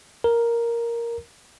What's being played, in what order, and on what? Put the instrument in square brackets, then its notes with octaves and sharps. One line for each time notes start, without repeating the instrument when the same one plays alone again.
[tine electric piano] A#4